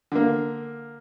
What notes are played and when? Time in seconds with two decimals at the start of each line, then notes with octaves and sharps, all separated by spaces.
0.12 D3 A#3